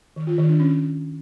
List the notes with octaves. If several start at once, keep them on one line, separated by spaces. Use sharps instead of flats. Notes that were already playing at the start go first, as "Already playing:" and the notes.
D#3
F4
D#3
D4
C#4